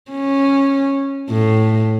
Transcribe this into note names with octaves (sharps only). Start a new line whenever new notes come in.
C#4
A2